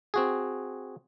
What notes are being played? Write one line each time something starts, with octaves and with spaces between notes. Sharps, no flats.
C4 F#4 G#4